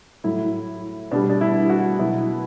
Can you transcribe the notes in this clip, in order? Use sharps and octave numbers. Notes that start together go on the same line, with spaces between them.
A2 F#3 E4
B2 G3 D4
D4
E4
F#4
B2 F#3 E4